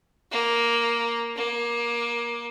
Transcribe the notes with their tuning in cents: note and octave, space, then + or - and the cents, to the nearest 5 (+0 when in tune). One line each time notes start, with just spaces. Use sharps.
A#3 +5
A#3 +20